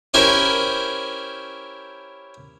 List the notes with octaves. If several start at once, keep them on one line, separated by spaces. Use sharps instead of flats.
C#4 E4 G4 A#4 C5